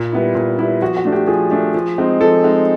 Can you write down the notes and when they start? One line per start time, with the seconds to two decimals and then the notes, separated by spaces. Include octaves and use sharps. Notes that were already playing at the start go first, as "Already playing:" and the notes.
Already playing: A#2
0.12 G3 B3 E4
0.35 A#2
0.59 G3 B3 E4
0.82 F3 F#4
0.97 F#4
1.05 A3 D4
1.12 G4
1.27 F3 G#4
1.51 A3 D4
1.75 F3
1.98 G#3 C4 D#4
2.21 F3 A4
2.44 G#3 C4 D#4